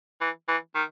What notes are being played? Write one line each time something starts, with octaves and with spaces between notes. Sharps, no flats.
E3
E3
D#3